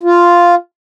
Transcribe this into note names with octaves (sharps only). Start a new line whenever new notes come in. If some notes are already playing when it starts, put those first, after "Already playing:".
F4